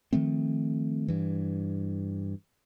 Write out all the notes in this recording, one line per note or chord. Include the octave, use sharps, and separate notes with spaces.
D#3 F3 A3 C4
G2 E3